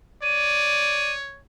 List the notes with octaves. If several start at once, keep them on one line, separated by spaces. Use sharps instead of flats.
C#5 D5 D#7